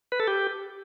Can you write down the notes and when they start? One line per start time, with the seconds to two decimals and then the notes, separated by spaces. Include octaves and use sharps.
0.12 B4
0.20 A4
0.27 G4